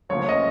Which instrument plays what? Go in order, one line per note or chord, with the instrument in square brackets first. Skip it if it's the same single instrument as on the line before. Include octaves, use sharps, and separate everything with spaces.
[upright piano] D2 C#3 F3 A#3 C#5
D#5